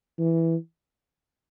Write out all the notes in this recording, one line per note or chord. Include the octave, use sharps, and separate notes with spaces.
E3